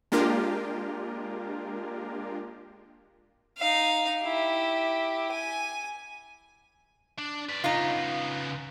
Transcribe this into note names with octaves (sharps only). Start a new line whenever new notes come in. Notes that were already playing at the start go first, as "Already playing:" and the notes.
G#3 A#3 D4 F4 G4 A#4
D#4 F5
E4 G4
G#5
D4
B4 D5
C#3 B3 D#4 F4